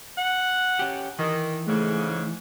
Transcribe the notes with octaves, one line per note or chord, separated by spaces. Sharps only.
F#5
C#4 G4
D#3 E3
G#2 C#3 A3